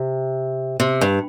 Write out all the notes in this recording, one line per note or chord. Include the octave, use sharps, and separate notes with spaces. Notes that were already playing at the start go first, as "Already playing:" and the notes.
Already playing: C3
C3
G2